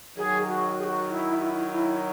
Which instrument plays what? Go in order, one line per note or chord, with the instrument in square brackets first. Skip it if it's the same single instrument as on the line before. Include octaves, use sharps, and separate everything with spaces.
[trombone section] D#3 F#3 [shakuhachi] G#4
[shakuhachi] F#4
G#4
F#4
E4
F#4
E4
E4